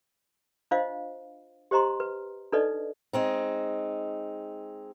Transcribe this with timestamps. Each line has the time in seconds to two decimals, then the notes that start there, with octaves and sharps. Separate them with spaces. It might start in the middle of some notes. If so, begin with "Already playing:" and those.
0.71 D4 F4 C5 D#5 F5
1.71 G4 C5 D#5 A#5 C6
2.00 B4
2.52 D4 D#4 A4 B4 D5 D#5
3.13 G#3 C4 D#4